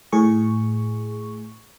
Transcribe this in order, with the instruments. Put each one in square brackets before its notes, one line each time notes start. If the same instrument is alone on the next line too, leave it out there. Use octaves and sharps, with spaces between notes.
[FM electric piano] A2 G#4 C#6